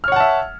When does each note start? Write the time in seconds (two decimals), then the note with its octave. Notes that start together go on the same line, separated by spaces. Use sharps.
0.04 F6
0.08 C#5
0.12 F#5
0.16 A5
0.20 E5